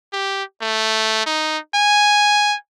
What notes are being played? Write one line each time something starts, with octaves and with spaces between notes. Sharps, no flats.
G4
A3
D#4
G#5